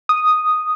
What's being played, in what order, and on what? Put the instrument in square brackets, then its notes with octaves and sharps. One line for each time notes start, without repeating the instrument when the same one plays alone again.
[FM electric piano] D#6